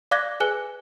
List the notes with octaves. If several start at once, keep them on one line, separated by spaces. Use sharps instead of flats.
D5 F5 D6 F#6 G#6 A#6
G#4 B4 G#5 F#6 G7